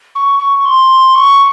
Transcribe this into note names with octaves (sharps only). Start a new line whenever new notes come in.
C#6
C#6
C6
C#6